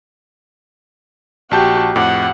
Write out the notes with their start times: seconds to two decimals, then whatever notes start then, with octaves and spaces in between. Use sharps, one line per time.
1.51 A#1 F#4 G4 A5 G6
1.96 F2 A2 F#5 D6